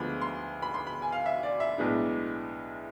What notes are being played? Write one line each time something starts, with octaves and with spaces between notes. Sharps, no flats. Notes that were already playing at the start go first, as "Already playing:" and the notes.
Already playing: D2 D3 F3 G#3 B3 B5
C6
B5
C6
B5
G#5
F5
E5
D5
E5
B1 A2 G#3 B3 D4